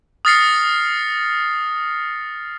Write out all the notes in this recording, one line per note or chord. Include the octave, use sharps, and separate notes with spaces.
D#6 F6 A6 A#6 C7 C#7